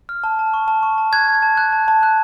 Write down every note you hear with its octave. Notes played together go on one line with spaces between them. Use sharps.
F6
A5
A5
C#6
A5
C#6
A5
F#6 G#6
A5
A5
F#6
A5
A5
F#6